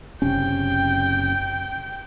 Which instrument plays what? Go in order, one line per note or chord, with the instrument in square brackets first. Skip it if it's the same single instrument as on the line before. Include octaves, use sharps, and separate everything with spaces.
[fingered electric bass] F#1 C3 C#4 [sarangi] G5